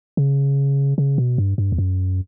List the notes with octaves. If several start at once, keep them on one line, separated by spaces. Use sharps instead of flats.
C#3
C#3
B2
G2
G2
E2
F#2